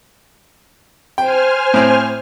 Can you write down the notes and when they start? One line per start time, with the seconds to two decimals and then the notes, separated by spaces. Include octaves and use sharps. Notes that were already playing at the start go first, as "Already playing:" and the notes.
1.18 C5 G5 G#5 F6
1.74 A2 C4